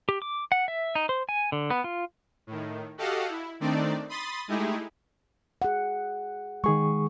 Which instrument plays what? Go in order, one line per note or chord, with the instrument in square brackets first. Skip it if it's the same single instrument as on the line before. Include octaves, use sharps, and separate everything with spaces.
[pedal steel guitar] G4
D6
F#5
E5
D#4
C5
G#5
D3
B3
F4
[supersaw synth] A2 D#3
F#4 G4 A4 D#5 F5 F#5
E4
D#3 A3 C4 D4 D#4 D5
B5 C6 D#6 A6
G#3 A3 D#4 E4 G4 G#4
[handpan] G#4 F#5
[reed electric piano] D#3 G#4 C#6 [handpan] G#3